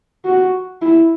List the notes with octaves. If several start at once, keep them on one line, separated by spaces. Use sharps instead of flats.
F#4
E4